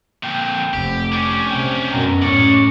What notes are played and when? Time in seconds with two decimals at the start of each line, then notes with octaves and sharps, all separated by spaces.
0.23 F2 A#2 G5
0.74 F1 G4
1.12 C#4 D4 G4
1.50 C3 G5
1.91 F#2 B2 A#5
2.22 A2 G#3 C#4 D5 C#6